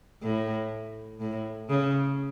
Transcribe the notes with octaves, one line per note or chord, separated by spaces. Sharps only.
A2
A2
C#3